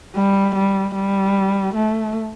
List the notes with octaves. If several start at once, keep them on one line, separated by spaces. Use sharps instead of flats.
G3
G3
G3
A3